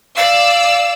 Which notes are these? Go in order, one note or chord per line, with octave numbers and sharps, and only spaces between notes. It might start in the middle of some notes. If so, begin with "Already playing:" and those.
D5 F5 E6